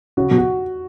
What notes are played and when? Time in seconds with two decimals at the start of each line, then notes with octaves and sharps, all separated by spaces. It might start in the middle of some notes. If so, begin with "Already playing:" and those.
0.17 C#3 F#4
0.31 B2
0.38 F#4